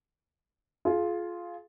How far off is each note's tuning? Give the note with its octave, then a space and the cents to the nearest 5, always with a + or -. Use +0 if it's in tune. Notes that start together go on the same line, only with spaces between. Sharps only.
F4 +0 G#4 +30